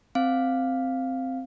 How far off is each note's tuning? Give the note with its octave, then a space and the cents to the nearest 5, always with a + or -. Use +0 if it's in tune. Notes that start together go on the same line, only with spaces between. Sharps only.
C4 +0 F5 +0